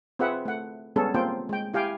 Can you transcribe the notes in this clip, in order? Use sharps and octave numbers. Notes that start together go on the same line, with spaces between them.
C4 F4 G#4 B4 E5 F#5
A3 F#5
G3 G#3 B3 C#4 G#4 A4
A#3 C4 F4 C5 G5
G#3 G5
E4 G4 F5 G5 G#5